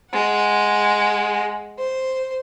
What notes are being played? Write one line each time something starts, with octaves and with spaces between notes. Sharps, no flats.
G#3 F#5
C5